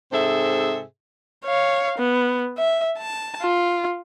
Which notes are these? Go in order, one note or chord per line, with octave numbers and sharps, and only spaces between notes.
G#2 C3 G#4 A4 C5 E5
C#5 F5
B3
E5
A5
F4